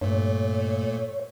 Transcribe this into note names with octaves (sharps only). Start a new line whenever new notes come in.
G2 A#2 A3 C#5